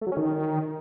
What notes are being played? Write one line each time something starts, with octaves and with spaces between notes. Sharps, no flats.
A3
F#3
C#4
D#3